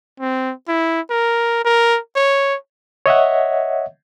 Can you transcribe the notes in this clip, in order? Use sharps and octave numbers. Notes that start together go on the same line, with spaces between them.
C4
E4
A#4
A#4
C#5
C#5 D#5 E5 F#5